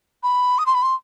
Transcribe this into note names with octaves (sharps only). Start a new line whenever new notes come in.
B5
D#6
C6
B5
C6